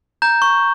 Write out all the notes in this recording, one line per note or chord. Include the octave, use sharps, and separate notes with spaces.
A#5 G6
C#6